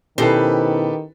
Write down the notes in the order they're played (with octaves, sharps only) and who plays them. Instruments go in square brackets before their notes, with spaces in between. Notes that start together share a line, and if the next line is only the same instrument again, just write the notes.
[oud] B2 C5 [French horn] D#3 [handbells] C#4 E4 [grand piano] G4 A4 B4